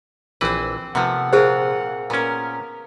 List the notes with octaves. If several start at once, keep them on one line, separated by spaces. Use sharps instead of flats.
A#1 E3 C4 B4 C5
C3 F3 A3 B3 F#5
A#2 C4 F4 G#4 C5
A#2 B3 C#4 A#4